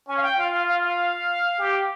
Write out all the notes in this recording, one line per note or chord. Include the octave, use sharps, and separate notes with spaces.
C#4 G#5
F5
G5
F4 F5
F5
F5
F5
G4